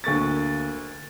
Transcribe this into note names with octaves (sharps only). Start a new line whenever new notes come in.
D2 A#3 C#6 A6